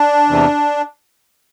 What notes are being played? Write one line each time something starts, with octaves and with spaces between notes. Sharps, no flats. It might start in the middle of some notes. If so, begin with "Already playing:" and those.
Already playing: D4
E2 C3 E3